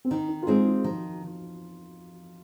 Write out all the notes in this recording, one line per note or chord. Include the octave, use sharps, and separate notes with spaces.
C4
D#3 D#4
D#4
F4
G#3 C4 D#4 G#4
D#4
D#3 F3